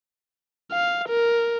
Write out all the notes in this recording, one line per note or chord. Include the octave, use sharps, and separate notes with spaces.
F5
A#4